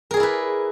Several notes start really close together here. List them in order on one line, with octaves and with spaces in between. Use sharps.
A#4 G#4 D5 E4 B4